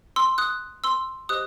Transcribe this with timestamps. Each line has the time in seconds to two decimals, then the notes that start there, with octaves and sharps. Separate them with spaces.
0.16 C6 E6
0.38 D#6 F#6
0.84 C6 E6
1.29 G4 C5 D#5 D#6 F#6